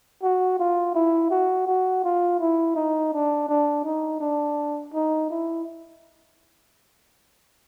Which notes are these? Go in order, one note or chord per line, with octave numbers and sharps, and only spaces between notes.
F#4
F4
E4
F#4
F#4
F4
E4
D#4
D4
D4
D#4
D4
D#4
E4